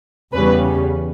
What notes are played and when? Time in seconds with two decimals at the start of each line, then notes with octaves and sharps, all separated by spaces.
0.33 E2 C#3 G3 C#4 B4